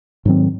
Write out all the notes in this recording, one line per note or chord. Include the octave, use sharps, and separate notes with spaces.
G#2 D#3 F#3 C4